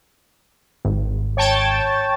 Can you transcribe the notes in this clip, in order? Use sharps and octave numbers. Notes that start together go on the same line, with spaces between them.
G#1
C#5 G5 A5